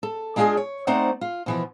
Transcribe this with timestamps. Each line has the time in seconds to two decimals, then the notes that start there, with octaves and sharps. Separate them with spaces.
0.03 A4
0.36 G#3 D4 F4 G#4 D#5 G#5
0.57 C#5
0.87 A3 C4 D#4 C5 D5 F#5
1.21 F4
1.46 B2 E3 F3